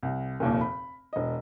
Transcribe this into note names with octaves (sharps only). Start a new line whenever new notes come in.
C2
F1 D#2 A#2
B5
E1 D#5